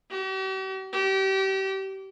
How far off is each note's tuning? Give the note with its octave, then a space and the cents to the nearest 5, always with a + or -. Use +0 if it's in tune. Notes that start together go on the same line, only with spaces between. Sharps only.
G4 -45
G4 -30